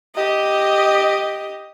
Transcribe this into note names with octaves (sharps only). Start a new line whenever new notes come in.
G4 D#5